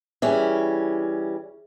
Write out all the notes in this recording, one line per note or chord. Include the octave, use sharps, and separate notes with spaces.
E3 G3 C#4 G#4 E5